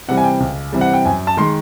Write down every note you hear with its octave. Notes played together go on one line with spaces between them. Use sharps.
C3 E3 G3 F#5
G#5
G5
C#2
C3 E3 G3
F#5
G5
F#2 G#5
A5
D#3 G#3 C6